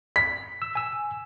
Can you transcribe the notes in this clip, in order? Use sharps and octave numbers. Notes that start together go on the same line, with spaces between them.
B6
E6
G#5 E6